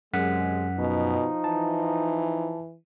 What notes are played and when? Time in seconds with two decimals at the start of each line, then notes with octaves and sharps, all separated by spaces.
0.14 F#2 C3 G#3 F#5 B6
0.79 B2 F3 D#4
1.44 E3 A5